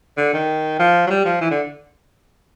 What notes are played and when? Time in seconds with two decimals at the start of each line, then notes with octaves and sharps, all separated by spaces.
0.17 D3
0.33 D#3
0.79 F3
1.07 F#3
1.10 G3
1.25 F3
1.41 E3
1.51 D3